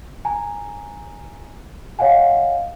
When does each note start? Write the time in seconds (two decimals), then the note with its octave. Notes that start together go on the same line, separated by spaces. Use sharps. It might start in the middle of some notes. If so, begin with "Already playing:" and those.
0.25 G#5 A#5
1.99 C#5 D#5 F5 F#5 G#5